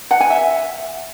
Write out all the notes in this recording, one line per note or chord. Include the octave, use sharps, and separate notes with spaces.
F#5
G#5
E5